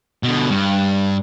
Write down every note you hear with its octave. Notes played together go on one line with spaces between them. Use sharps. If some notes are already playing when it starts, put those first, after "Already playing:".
B2 D3
G2